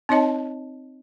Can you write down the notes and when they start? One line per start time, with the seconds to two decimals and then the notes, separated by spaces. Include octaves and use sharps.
0.09 C4 D#4 C#5 D#5 A5